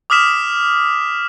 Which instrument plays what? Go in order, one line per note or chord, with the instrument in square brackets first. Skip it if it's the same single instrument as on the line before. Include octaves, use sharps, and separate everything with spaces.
[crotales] D6 D#6 F6 B6 E7